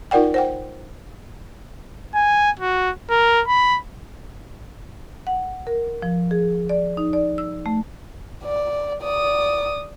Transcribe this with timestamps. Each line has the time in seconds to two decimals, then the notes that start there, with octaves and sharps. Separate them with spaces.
0.11 D#4 F4 A#4 D5 F#5 G5
0.34 C5 F#5 G5
2.15 G#5
2.60 F#4
3.10 A#4
3.48 B5
5.27 F#5
5.67 A#4
6.02 F3
6.31 G#4
6.69 D5
6.97 D#4
7.13 D5
7.38 E6
7.66 A3
8.44 D5
9.02 D5 D#6